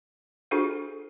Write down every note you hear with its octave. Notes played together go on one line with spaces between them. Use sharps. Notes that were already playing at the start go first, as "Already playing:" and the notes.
D4 F4 F#4 G#4 A4 C5